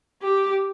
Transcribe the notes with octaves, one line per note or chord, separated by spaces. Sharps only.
G4